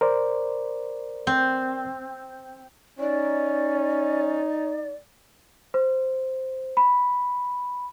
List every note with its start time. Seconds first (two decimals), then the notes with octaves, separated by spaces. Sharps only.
0.01 A#4 C5 D5
1.27 C4
2.99 C#4 D#4 D5
5.74 C5
6.77 B5